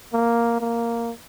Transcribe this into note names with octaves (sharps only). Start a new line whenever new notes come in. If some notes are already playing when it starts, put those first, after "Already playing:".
A#3
A#3